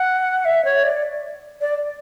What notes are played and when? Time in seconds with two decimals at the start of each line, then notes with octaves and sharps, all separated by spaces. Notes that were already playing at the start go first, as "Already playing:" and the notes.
Already playing: F#5
0.45 E5
0.64 C#5
0.83 D5
1.61 D5